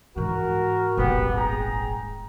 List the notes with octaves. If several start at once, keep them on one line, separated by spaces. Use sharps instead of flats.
G#2 E3 F#4 A#4
D#1 G#1 B3 G4
G#4 G5 A#5